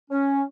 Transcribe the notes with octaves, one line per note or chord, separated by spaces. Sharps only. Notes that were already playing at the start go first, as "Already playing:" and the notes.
C#4